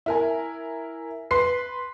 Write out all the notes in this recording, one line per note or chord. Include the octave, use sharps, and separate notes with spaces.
E4 A#4 G#5
B4 C6 C7